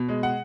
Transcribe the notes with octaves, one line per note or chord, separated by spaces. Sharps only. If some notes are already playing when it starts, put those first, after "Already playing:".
Already playing: B2
G#3
F#5